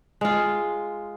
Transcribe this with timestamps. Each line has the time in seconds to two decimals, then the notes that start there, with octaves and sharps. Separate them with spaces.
0.21 G#3 F4